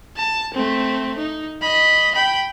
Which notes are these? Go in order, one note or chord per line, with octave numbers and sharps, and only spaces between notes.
A5
A3 C4
D#4
D#5 B5
G5 B5